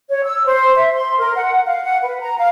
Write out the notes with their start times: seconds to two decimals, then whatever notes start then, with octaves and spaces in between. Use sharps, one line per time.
0.09 C#5
0.25 E6
0.46 C5
0.76 E5
0.94 C6
1.18 A#4
1.35 F#5
1.66 F5
1.83 F#5
2.02 B4
2.20 A#5
2.38 F5